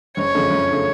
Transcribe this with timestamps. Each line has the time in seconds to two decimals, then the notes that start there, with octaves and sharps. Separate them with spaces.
0.17 F#1 C#5
0.34 F2 C#3 A3
0.51 F#1
0.71 C#3 A3